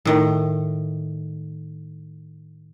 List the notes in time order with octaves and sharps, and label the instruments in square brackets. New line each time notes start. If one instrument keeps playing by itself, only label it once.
[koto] A2 D#3